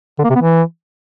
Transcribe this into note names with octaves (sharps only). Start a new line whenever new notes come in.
D3
A#3
C3
B3
E3